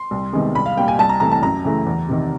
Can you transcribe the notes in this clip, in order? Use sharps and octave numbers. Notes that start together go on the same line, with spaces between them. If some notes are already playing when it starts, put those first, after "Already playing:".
Already playing: C6
C2
C3 D#3 G#3 B3
C2 B5
F5
A#2 G3 A#3 G5
G#5
C2 A5
A#5
C3 E3 A3 A#5
A5
F#2 A#5
C#3 E3 A3
E2
C3 D#3